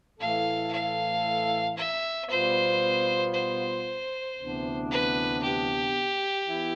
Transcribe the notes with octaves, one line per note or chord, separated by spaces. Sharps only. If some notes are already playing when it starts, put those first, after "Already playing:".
A2 E3 A3 E4 A4 F5
F5
E5
B2 G3 B3 F4 C5
C5
D2 C3 E3 B3 D4
B4
G4
E3 B3 E4